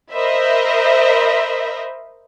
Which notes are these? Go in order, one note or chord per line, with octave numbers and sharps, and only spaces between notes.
A#4 C5 D#5 E5 B5